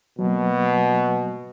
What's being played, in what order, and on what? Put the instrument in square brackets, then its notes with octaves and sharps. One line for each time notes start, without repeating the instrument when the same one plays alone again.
[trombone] B2 [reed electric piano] F#3 A#3